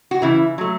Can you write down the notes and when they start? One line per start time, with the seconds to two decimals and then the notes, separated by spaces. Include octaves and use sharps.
0.11 F#4
0.22 C#3 E3 E4
0.58 F#3 A3